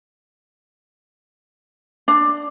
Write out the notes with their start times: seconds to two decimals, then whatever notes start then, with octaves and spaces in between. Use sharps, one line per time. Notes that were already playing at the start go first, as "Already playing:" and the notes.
2.08 D4